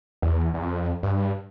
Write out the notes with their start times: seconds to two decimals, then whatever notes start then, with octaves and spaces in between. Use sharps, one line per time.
0.22 E2
0.54 E2
0.63 F2
1.03 G2